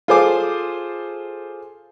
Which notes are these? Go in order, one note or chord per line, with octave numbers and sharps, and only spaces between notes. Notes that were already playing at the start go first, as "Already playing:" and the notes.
F4 G#4 A4 C5 G#5 D6